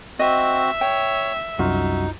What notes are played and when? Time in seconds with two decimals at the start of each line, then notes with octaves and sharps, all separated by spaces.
0.19 C4 F#4 D#5 E5
0.81 C#5 G5
1.59 C2 F#2 D#4 F4 F#4